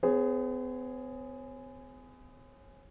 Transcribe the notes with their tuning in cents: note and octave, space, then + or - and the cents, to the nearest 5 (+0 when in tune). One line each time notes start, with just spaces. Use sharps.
B3 +45 G#4 +0 C#5 -25